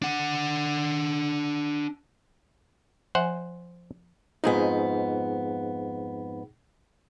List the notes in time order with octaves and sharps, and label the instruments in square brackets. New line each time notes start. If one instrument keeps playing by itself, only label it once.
[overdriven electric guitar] D4 F#5
[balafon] F3 E5 G#5 [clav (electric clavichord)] C5 F#5
[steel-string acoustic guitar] F2 G#2 B3 [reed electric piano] D#4 G#4